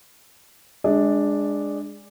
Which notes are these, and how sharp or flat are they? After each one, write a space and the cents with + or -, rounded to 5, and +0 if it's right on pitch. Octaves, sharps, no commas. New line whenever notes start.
G#3 -10 D4 +0 D#5 +40